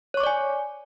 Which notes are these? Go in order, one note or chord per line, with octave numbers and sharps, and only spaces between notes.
C#5 D5 G#5 C#6 D6